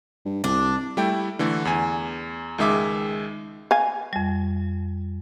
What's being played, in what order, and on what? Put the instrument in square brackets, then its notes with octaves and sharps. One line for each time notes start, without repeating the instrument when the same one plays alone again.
[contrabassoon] G2
[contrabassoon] C2 [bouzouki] D4
[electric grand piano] G3 A3 E4 G5
D3 E3 A3
E2 G#5
C#2 D#3 G#3 E5 D6
[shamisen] F5 G#5
[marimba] F2 G3